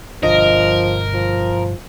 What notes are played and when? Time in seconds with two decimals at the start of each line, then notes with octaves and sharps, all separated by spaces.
0.23 G1 B2 F3 D4 A#4 D#5
1.14 F3